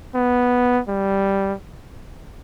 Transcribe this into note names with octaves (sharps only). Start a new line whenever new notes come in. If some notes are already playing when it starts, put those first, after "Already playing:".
B3
G3